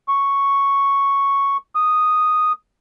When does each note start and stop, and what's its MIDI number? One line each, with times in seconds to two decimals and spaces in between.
0.08 1.57 85
1.75 2.52 87